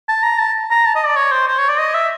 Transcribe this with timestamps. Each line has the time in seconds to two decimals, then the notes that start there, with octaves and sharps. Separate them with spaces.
0.08 A5
0.23 A#5
0.38 A5
0.70 A#5
0.85 A5
0.95 D#5
1.06 D5
1.16 C#5
1.32 C5
1.48 C5
1.59 C#5
1.69 D5
1.78 D#5
1.94 E5